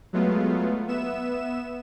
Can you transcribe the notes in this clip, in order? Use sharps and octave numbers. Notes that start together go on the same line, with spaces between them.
F#3 G#3 A3 B3 F4
B3 E5 E7